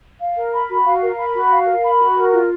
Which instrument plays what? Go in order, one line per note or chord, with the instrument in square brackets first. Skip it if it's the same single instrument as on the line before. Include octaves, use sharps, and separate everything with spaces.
[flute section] F5
A#4
B5
F#4
F5
A#4
B5
F#4
F5
A#4
B5
F#4
A#4
F4